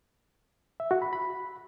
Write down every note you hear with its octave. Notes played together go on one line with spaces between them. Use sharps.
E5
F#4
B5
B5